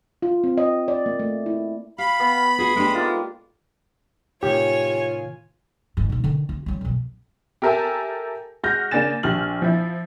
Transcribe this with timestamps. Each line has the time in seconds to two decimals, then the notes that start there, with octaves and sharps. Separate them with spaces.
0.22 F4
0.44 C4
0.58 D#5
0.88 D5
1.06 A#3
1.19 A3
1.46 E4
1.98 G4 F5 B5
2.20 B3
2.58 F4 F#4 G#4
2.76 G#3 A3 D4 G4
2.95 A#3 D#4 F4
4.43 A2 C3 D#3 F4 G4 C#5 G#5
5.97 G1 G#2
6.10 A#1 D#4
6.24 D3 D#3
6.49 F4
6.66 F#3 G3
6.81 B1 F#2
7.62 G4 A4 A#4 E5 G#5 A5
8.64 G#3 F#4 F6 G6 A#6
8.91 C#3 A#3 D4 G#5 A6 E7
9.23 A#1 G4 F6 F#7
9.62 F3 E4